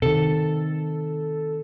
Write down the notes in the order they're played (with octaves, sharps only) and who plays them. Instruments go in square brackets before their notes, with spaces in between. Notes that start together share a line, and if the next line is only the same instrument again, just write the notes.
[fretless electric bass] C3 D#3 [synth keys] A4